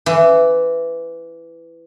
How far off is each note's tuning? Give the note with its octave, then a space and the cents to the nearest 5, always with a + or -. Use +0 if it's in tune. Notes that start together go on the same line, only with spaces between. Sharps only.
E3 +15